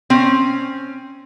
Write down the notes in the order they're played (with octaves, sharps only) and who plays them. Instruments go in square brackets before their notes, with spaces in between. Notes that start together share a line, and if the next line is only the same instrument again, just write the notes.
[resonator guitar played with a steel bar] C4 C#4